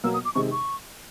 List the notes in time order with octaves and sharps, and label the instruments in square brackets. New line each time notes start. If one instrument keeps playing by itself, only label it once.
[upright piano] B2 F#3 A#3 [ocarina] E6
[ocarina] D#6
D6
[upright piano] C3 D#3 G#3 [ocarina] C#6
[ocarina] C#6